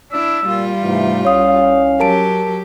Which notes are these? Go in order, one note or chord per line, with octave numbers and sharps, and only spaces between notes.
D4 E4 E6
A#2 G3 F4
G#2 C3 E3 A3
C2 C#4 C#5 F5 D#6
F#3 G4 A#4 A5 D7